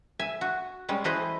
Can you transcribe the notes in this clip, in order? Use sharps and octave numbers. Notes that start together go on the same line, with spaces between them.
E5 G#5
F#4
G3 G#3 C#4
E3 A3 E4 B4 C5 D#5